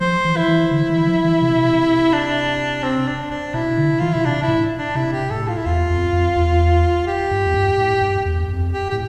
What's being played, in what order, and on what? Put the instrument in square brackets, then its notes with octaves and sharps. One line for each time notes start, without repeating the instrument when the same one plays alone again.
[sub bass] F3 [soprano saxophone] C5
[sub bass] E3
[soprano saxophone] E4
[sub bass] E3
D3
E3
F3
E3
C3
B2
C3
[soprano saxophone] D4
C4
D4
D4
[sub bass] B2 [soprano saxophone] E4
[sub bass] D3
[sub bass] E3 [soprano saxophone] F4
[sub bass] B2 [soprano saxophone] E4
[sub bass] C3 [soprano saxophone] D4
[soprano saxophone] E4
[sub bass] A2
[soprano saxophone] D4
[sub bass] C3 [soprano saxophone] E4
[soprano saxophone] G4
[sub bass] A2 [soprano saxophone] A4
[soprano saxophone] F4
E4
[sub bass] E2 [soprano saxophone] F4
[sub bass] F2
F2
E2
[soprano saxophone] G4
[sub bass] G2
F2
G2
A2
G2
E2
F2
[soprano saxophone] G4
[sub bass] A2 [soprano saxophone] G4